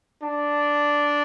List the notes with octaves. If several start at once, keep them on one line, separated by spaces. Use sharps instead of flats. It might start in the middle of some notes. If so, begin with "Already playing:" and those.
D4